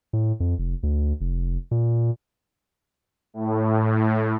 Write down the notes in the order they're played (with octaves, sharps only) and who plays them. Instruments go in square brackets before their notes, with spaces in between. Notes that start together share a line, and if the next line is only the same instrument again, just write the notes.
[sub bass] A2
F2
F1
D2
F1
A#2
[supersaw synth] A2